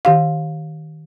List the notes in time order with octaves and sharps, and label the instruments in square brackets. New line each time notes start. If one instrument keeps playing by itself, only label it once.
[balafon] D#3 G4 F5